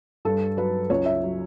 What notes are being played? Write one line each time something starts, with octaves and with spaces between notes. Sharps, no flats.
G2 A4
F#3 B4
C#2 C#5
E5
F#3